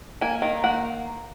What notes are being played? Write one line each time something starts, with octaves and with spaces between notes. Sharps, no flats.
A#3 G#5
D#3
A#3 F#5